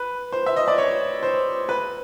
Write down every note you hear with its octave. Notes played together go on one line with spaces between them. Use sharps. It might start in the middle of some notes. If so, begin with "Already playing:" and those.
Already playing: B4
C5
E5
D#5
D5
C#5
C5
B4